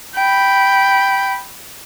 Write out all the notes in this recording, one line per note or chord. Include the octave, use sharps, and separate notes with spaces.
G5 B5